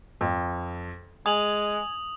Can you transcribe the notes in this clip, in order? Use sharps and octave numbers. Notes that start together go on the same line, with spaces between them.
F2
G#3 G#5 D#6 F7 F#7